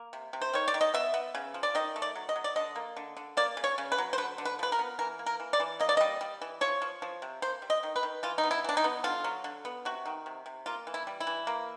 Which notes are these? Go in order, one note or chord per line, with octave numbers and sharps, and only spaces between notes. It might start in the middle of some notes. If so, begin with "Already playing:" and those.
Already playing: A#3
C3
C3
C5
D#3 C#5
D5
D#3
D#5
B3 E5
B3
C#3
F3
D5
D#3 D#5
A3
D5
F#3
D#5
F#3
D5
D3 D#5
A#3
D3
D3
A#3 D5
C#3
C#5
C#3
B4
F#3
C5
D3 B4
D3
B4
F3 B4
A#4
B3
E3 A#4
A#3
A#4
E3
D5
E3
A#3 D#5
D5
G3 D#5
G3
E3
F3 C#5
F3
F3
C3
A#3 C5
G3
D#5
D#3
B4
D#3
E3 F4
D#4
B3
E4
E3 D4
D#4
B3
D3 F4
F#3
D3
B3
C3 F#4
D#3
C3
C3
A#3 F4
E3
E4
G3
E4
E3
A#3